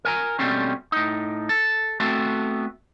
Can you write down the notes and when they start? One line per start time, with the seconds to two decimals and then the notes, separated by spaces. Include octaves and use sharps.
0.05 A#4 G#5 A#5
0.39 B2 F#3 G3 A3 C4 C#4
0.92 A2 D#4
1.49 A4
2.00 A3 B3 C4 F#4 A4